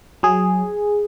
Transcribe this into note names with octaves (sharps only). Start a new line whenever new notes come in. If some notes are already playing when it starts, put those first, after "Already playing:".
F#3 G#4